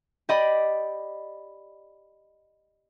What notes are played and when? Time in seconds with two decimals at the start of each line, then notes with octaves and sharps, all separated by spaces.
0.29 G4 D5 D#5 B5